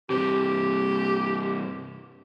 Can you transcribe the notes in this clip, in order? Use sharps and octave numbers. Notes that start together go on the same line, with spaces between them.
G2 C3 G4